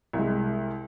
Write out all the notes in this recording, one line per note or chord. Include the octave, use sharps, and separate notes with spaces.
C2 G#3